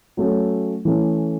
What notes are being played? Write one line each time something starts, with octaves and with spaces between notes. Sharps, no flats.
F#3 A3 C#4 A4
E3 A3 C#4